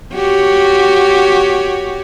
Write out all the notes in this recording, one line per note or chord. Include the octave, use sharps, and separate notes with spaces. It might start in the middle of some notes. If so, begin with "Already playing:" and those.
F#4 G4 C#5